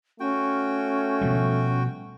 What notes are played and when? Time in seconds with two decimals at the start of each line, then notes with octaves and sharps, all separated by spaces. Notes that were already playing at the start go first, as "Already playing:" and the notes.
0.20 A3 C#4 F#4 G5
1.21 B2 F3 G3